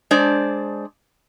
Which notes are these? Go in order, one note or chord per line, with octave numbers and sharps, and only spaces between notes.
G#3 D4 C5 D5